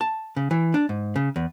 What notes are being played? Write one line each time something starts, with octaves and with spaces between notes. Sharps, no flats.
A5
C#3
E3
D4
G#2
C#3
E2